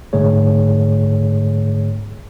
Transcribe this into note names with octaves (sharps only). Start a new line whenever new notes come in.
G#2 D3 A3 G#4 C#5